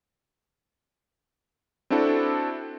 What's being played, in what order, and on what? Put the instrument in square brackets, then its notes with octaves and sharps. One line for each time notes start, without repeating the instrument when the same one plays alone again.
[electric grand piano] C4 D4 E4 F#4 A4